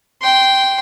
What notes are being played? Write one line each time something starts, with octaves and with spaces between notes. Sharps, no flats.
G5 C6